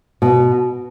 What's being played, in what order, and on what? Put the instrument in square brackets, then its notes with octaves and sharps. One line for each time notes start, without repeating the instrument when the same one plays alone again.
[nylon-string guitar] B2